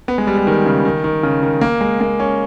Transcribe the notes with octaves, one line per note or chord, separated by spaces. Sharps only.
B3
G#3
G3
G3
D#3
C#3
D#3
D#3
C#3
D#3
A#3
G#3
A#3
C#4